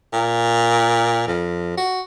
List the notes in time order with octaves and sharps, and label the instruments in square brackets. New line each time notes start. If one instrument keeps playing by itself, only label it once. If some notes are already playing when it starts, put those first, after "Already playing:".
[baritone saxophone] A#2
F2
F#4